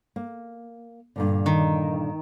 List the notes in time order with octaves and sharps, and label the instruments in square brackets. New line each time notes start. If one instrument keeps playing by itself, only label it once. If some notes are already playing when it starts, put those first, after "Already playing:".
[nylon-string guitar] A#3
G2 A#2 D3
[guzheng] D#3